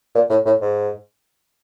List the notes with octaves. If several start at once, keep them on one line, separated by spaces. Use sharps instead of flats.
A#2
A2
A2
G#2